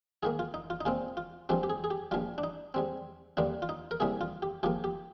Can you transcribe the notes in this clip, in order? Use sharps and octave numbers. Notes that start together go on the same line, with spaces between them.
G#2 D#3 A#3 G#4
F4
D#4
F4
D#4
A#2 G#3 C4 F4
F4
G2 F3 G#3 C4 G4
G4
G#4
G#4
G4
A#1 G#2 G3 F4
D4
D#4
G#2 G3 C4
D#2 D3 G3 A#3 D4
F4
D#4
A#4
C2 C3 G3 A#3 G#4
F4
G4
G#2 F3 A#3 G4
G4